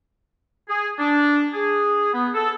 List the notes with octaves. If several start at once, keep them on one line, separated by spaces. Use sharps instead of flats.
G#4
D4
G#4
B3
A4